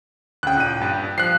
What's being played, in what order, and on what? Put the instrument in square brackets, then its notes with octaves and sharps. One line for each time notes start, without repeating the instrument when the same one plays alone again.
[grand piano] D2 C#3 [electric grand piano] G5 F#6
[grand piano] D#1 D#7
G2
[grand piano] F3 [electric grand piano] F#6 C7